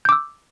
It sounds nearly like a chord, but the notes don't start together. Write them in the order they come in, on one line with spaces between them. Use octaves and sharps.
G6 D6 E6